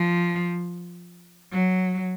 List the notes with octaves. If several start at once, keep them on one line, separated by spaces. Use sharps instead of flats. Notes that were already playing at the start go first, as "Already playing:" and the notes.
Already playing: F3
F#3